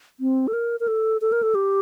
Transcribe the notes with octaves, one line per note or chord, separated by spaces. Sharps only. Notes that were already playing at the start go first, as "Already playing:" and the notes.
C4
A4
A#4
A#4
A4
A4
A#4
A4
G4